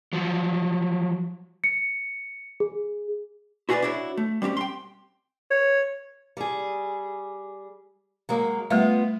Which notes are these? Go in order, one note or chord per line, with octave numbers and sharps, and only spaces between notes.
F3 F#3
C#7
G#4
E4 F#4 G#4 A4 B4 D5
D4 E4 F#4 C#5
A3
G3 C4 C#4 G4
G5 C6
C#5
G3 G#4
F#3 G#3 A#3
G3 A3 B3 F4 E5